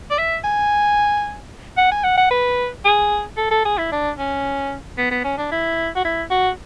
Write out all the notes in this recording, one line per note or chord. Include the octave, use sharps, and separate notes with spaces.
D5
E5
G#5
F#5
G#5
F#5
F#5
B4
G#4
A4
A4
G#4
E4
D4
C#4
B3
B3
C#4
D4
E4
F#4
E4
F#4